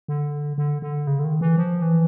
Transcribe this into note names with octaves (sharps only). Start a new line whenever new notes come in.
D3
D3
D3
C#3
D3
D#3
E3
F3
E3